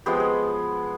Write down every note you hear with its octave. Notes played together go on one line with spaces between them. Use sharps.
F3 G#3 B3 G4
G#4